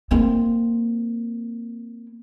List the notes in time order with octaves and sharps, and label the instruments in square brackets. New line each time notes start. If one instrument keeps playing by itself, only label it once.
[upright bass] A#3 C4